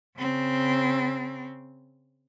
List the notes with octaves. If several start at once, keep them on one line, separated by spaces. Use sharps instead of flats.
C#3 C4